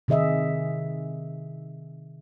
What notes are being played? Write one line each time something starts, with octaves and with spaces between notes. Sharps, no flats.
C3 D#3 G#4 D#5 E5